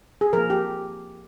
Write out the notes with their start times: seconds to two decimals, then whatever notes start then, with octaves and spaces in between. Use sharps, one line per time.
0.21 G#4
0.33 F3 A#3 A#4
0.50 G4